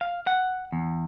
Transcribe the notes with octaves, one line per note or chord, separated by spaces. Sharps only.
F5
F#5
E2